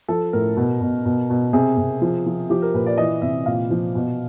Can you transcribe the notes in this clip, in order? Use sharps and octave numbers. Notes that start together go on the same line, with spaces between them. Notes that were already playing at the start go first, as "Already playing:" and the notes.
F3 A4
A2 A#4
B2
B2
B2
B2
C3 G#4
C3
F3
F3
F3 G4
A#4
A#2 B4
D5
E3 D#5
C3 E5
A#2 F5
F3
B2